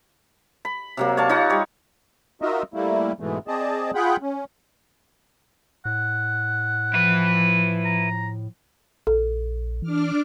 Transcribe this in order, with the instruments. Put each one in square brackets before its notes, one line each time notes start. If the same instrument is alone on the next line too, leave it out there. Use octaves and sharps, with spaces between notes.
[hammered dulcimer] B5
C3 F#3 A#3
C#5 D5 F5 A5
D#4 F4 C#5 F#5
G3 C#5
[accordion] D#4 F4 F#4 A#4 D#5 E5
G3 A3 A#3 E4
G#2 B2 E3 G#3 A3
C4 G#4 D5 D#5 A5
F4 G#4 F#5 G5 B5
C#4
[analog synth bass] A2 [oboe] F#5
[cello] F3 [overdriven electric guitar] E4 B4
[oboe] A#5
[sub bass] A#1 [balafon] A4
[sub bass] E3 [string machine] D4 D6 F6